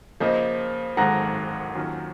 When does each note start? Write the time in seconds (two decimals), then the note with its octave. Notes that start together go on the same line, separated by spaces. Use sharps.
0.20 C#3 F3 A#3 C5 D#5
0.97 G#1 F#2 D#3 G#3 F#5 A#5
1.75 D#2 D#3 F#3 C#4 F4